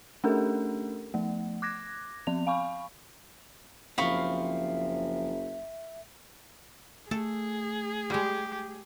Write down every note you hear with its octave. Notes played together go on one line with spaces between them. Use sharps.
A3 C#4 D4 G4 A4 A#4
F3 A3
D6 F#6 G#6 A#6
F3 C4 F7
F5 G#5 B5 C#6
F#1 F3 C4 E5 F5 B5 C#6
A3 G#4 A4
G3 G#3 G4